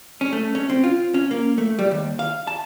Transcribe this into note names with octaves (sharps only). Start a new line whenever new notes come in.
C#4
A3
C#4
C4
F4
C#4
A#3
A3
G3
D#2
F5
A5